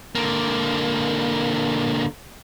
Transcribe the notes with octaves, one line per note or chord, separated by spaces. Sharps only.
D3 A#3